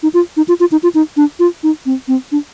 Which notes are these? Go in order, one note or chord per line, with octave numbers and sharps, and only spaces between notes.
D#4
F4
D#4
F4
F4
D#4
F4
D#4
D4
F4
D#4
C4
C4
D4